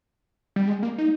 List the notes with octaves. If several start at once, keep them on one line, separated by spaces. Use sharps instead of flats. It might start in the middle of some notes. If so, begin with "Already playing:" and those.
G3
G#3
A#3
D#4